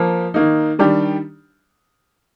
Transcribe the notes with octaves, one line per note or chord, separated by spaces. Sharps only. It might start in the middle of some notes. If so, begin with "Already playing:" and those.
Already playing: F3 A#3
D#3 A#3 D#4
D#3 G3 D4 G4